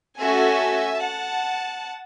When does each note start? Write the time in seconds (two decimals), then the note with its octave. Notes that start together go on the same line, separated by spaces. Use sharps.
0.18 A3 C#4 F#4 A4 E5 G#5
1.00 F#5 A5